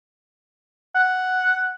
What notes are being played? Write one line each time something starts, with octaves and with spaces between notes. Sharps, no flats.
F#5